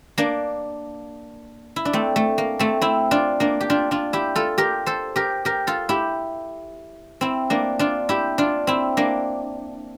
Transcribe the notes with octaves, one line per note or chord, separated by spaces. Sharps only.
A#3 D4
E4
D4
A3 C4
A3
A#3
A3 C4
C4 E4
D4 F4
A#3 D4
G4
D4 F4
D4 F4
E4 G4
F4 A4
G4 A#4
A4 C5
G4 A#4
G4 A#4
F4 A4
E4 G4
C4 E4
A#3 D4
D4 F4
E4 G4
D4 F4
C4 E4
A#3 D4